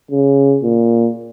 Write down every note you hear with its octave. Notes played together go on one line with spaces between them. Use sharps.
C#3
A#2